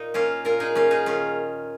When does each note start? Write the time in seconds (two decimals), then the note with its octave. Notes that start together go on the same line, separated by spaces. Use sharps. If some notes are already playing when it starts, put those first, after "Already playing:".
Already playing: A#2 D#4
0.14 A#3 C#4 F4
0.45 A#2 F4 A#4
0.60 D#4 G#4
0.75 A#3 C#4 F4
0.91 D#4 G#4
1.06 D#3 C#4 F4